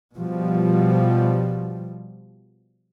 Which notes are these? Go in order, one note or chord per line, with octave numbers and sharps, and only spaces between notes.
B2 F3 G3